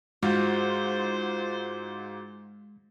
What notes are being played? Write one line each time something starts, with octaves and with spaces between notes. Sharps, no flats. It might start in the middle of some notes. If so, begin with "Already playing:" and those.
G#2 G#3 F4 F#4 C5